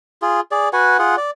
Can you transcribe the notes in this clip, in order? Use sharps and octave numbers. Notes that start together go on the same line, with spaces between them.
F4 G#4
G#4 D5
F#4 B4 F#5 G#5
F4 G#4 F#5
D5